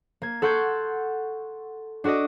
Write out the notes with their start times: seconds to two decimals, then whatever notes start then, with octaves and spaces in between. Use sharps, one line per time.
0.22 A#3 G#6
0.42 A4 F#5 C6 C#6 G6 G#6
2.04 D4 F#4 A4 D5 D#5